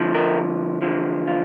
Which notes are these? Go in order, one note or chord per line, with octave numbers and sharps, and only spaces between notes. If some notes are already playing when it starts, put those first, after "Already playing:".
Already playing: D2 D3 F3
A#4
E2 D3 F3
F4